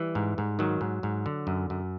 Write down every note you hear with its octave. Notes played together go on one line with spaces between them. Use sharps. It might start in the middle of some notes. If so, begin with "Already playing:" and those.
Already playing: E3 G3
G#2
G#2
D#3 F#3
G#2
G#2
D3
F#2
F#2